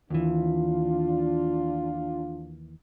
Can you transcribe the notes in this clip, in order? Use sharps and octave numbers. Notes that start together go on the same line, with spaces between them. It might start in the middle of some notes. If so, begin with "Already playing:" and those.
D#2 E3 D4 F4